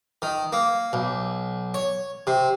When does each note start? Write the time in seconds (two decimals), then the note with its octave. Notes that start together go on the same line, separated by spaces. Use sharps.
0.22 D#3
0.52 A#3
0.93 B1
1.74 C#5
2.27 C3